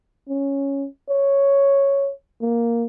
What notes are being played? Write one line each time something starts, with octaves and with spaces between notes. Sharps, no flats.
C#4
C#5
A#3